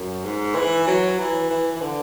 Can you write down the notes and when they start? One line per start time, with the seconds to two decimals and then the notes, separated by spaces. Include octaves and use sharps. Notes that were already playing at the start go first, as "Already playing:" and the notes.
Already playing: F#2
0.25 G#2
0.55 E3
0.87 F#3
1.19 E3
1.50 E3
1.76 E3
1.82 D3